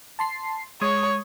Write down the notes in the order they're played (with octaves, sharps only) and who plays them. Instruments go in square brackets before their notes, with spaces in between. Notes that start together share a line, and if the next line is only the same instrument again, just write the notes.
[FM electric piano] A5 C6 C7
[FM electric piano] G#3 D#6 G#6 [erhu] C#5